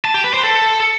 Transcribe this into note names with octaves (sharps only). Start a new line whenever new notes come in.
A5
G4
B4
C5
A4